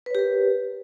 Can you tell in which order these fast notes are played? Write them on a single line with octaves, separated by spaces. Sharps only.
B4 C#5 G4 A#4